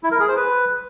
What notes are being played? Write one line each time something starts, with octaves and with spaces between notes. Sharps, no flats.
E4
A#4
G#4
C5
B4